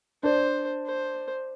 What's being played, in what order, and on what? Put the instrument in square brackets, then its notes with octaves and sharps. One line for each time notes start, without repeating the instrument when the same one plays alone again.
[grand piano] D4 [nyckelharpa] C5
[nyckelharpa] C5